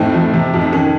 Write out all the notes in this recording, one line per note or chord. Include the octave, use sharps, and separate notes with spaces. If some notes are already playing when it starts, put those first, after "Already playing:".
Already playing: F2 A2 C4 D#4
F3
C3
F2
D#4
D#3 C#4